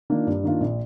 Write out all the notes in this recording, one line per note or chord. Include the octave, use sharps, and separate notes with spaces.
D#3 A#3 D4 F4
G2
D#3 A#3 D4 F4
A#1